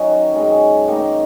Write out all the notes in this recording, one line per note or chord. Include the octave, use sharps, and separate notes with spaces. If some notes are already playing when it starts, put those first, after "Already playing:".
Already playing: D#3 F#3 C#4
F#2 D#3 G#3 C#4
D#3 A#3 D#4